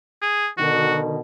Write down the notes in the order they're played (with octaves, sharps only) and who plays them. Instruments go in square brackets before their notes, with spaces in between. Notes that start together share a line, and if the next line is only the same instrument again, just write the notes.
[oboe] G#4
[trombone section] B2 D3 D#3 [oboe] F#4